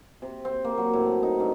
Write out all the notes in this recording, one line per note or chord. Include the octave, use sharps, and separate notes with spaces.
C3
C4
A#3
F#3
A2
D#4
G2